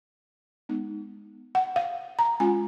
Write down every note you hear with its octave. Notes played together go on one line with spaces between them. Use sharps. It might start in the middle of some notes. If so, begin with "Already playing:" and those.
G#3 B3 D#4
F#5
F5
A#5
G#3 C#4 F4 G#5